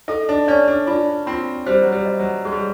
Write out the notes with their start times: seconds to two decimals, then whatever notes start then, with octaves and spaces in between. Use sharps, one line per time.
0.08 D#4 A4
0.29 D4
0.48 C#4 D5
0.68 D4
0.87 D4 F4
1.27 C4 F4
1.66 G3 C5
1.82 F#3
1.92 G3
2.06 D#5
2.19 F#3
2.45 G#3 G#4
2.52 G3